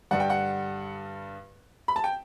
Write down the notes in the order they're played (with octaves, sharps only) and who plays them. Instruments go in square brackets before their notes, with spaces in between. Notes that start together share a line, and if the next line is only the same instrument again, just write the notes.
[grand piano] G2 D3 G3 F#5
G5
F#5
B5
A5
G5